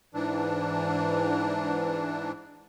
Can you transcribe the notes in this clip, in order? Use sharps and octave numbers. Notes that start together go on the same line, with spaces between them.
G#2 E3 D4